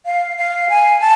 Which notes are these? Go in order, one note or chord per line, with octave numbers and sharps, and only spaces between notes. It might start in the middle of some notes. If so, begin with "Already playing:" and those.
F5
F5
G#5
A5